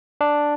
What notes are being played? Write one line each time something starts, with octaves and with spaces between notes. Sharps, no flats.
D4